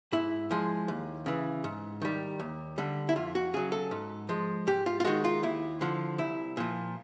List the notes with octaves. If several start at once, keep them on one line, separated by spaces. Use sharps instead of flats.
G#2 E4
F3 G#3
D#2
C#3 E3
G#2
D#3 G3
D#2
D3 G3
E4
F2 F4
F#4
C#3 F#3 G#4
A4
G#2
F3 G#3
G#2 G4
F4
F4
D#3 G#3 F#4
F4
D#2 E4
D3 F3
C2 E4
A#2 F3